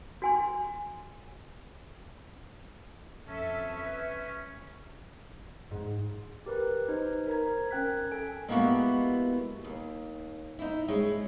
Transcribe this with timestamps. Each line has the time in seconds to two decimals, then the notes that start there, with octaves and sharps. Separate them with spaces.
0.22 F#4 G#5 C6
3.28 F2 C#4 A4 E5
3.72 B4 E5
5.71 G#2
6.46 G4 A#4 B4
6.89 D#4 B4 C5
7.27 A#4 C5 A#5 G#6
7.71 C#4 A#4 G5 F#6 G#6 B6
8.12 A4 G#5 D7
8.48 G#3 A#3 B3 E4 F#4 G4
9.64 D#2
10.59 D#4 E4
10.88 G#3 C#4 E4